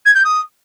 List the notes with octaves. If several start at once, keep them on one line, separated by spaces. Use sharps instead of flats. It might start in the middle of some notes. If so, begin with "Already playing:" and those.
G#6
G6
D#6